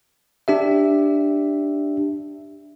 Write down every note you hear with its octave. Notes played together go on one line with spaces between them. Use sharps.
D4 G4 E5